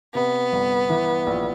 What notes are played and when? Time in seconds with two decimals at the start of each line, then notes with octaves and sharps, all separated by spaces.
0.15 C3 B3
0.53 G1
0.90 E3
1.27 A#1